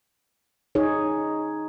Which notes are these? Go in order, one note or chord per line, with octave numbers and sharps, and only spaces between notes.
D#4 G#4 C#5